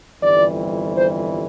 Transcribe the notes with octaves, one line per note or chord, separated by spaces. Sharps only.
G1 F2 E3 G3 D5
C5